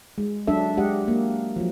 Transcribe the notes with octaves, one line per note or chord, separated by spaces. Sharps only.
G#3
F#3 D4 A4 E5
G#3 G4 D#5 F#5
A#3
F3 F#3